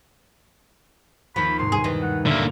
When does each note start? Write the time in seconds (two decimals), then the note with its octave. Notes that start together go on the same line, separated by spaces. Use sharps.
1.36 D#2 F3 B5 C#6
1.59 C2 G#2 C3 C6
1.72 G2 B2 G#4
1.84 D#3 E3
2.02 F#5
2.26 A#2 D3 A#3 E5